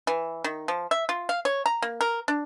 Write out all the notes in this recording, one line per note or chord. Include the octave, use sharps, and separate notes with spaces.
E3
D#3
F3
E5
F4
F5
C#5
A#5
A#3
A#4
D4